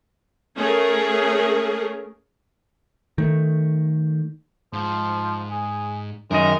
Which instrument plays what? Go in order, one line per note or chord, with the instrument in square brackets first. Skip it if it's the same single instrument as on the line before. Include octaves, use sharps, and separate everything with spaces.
[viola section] A3 C#4 G#4 A#4
[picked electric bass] D#3 A3
[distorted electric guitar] G#2 [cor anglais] F3
[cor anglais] G#4
[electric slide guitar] F#2 D#3 D#5 [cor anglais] G#3 [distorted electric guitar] A#4